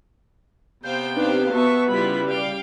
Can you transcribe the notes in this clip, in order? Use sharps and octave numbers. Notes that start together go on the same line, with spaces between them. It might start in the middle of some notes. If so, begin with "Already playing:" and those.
C3 B3 C5 F5 G5 G6
C4 D4 D#4 G4 B4 C5 F5
B3 F#4 E5 A5 C#6
C#3 G3 E4 F4 B5
D5 F5 G5